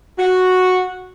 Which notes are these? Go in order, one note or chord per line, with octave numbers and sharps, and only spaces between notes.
F#4